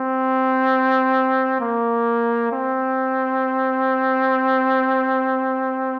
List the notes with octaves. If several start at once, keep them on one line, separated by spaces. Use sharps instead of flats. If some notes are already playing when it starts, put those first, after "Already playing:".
Already playing: C4
A#3
C4